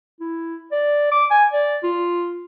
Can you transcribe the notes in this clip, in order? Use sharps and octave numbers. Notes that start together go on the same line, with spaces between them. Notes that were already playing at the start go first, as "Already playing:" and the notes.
E4
D5
D6
G#5
D5
F4